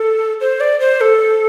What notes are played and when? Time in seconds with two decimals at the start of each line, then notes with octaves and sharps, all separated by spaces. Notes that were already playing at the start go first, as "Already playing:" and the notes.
Already playing: A4
0.41 C5
0.60 D5
0.80 C5
1.01 A4